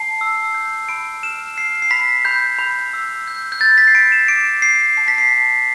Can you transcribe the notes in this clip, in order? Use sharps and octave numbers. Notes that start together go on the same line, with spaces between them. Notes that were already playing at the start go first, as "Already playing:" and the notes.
Already playing: A5 C7
E6
G6
B5 D7
F6 E7
F6 C7
C7
B5 B6
B5 G6
B5
E6
G6
G6
B5 A6
B6
C7
B5 D7
E7
D6 D7
G6 C7
A5 C7
B6
C7
A5